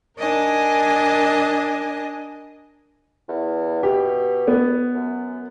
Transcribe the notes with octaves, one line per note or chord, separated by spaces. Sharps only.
D4 A#4 D#5 G#5
E2
B2 G4
B3
F#2